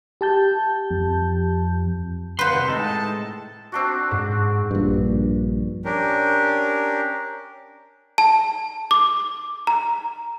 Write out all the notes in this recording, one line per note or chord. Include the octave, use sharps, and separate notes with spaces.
G4 A5 G6
F2
C#2 G3 B4 C5 F5 F#5 C6
C3 D#3
A2 G#3 D#4 A4
A5
C4 D4 F#4
G#2
A#1 G2
C#4 D4 G4 A#4
A5
D6
A#5